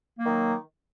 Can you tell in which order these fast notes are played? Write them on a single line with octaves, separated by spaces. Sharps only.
A#3 F#3 D#3